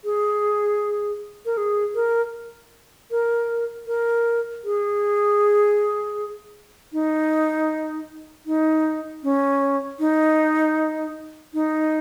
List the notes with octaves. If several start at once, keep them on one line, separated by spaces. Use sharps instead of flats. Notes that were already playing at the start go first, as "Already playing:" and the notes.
G#4
A#4
G#4
A#4
A#4
A#4
G#4
D#4
D#4
C#4
D#4
D#4